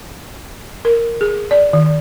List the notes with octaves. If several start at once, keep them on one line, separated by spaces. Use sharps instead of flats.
A#4
G#4
D5
D#3